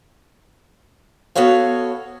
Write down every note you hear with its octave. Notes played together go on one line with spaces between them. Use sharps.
B3 F#4 A4 C#5 F5